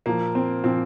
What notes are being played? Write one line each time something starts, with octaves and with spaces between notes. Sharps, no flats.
A#2 F3 A#3
C4
A#2 F3 C4